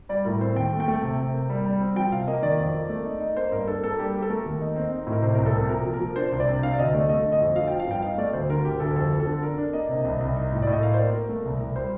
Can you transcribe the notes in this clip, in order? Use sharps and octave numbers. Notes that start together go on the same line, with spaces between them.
G3 D5
A2 A#4
C4 C5
D#2 G5
A3
G5
A3
G5
C3
C3
A#3
G3
G3
C4
F3 G5
C3 F5
A#3 D#5
D#3 D5
F2
A#3
A3
D#4
D#4
A#3 C5
G2 A#4
D4 A4
A#3 A4
G3 G4
A#3 G4
A4
A3 A#4
D#2
D#4
C4
D#4
A2
A#4
C3 C5
C2 A#4
A4
C3
A#2 A#4
F3
A#4
F3
D4 C5
C2 C5
D5
C3
D4 F5
D5
D2 D#5
A3 D5
A3 D#5
D3
D#5
F2
F3 F5
F3 G5
F5
G2 G5
D#4 F5
A3 D5
D2 C5
D3 A#4
D2 G4
D2 A4
F2 A4
F2
A4
D3
D4 A#4
D4
A#3 D#5
C3
C2
C2
D#4
A2
A2 D5
D#5
A#3 F5
C5
A#3 D5
A#3 A#4
A3
C2
C2
G3 C5